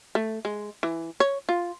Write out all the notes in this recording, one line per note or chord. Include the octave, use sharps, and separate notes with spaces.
A3
G#3
E3
C#5
F4